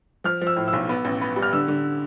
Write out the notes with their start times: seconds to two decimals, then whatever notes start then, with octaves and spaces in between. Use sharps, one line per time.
0.24 F3 F6
0.41 F3
0.47 E6
0.56 A2
0.68 E6
0.73 B1
0.89 B3
1.05 A1
1.21 B3
1.36 G3
1.42 F6
1.53 D3 E6
1.68 D3